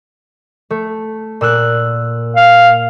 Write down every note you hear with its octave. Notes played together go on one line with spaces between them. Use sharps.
A3
A#2 E6 F#6
F5